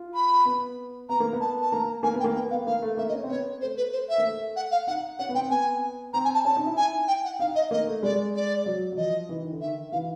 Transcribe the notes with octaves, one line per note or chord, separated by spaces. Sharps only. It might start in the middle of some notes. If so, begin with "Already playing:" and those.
Already playing: F4
B5
B3
B3 A#5
A#3
B3
A5
A5
A#3 A#5
A#3 G#5
B3
G5
A#3
B3 G5
B3 F5
A#3 F5
A3
A#3 E5
D#5
C#4
C4
B3 C#5
A3 C5
B4
C5
E5
A#3
A3
F#5
F5
D#4 F#5
C#4 F#5
B3
C4 G5
B3 G#5
C4 A#5
G#5
A5
C#4 A5
D#4
E4
G#5
G5
F#5
D#4 F5
D#5
A#3 D#5
A3
G#3 D5
D5
F#3
F#3
F3 D#5
E3
D#3
D3
D#3 E5
E3 F5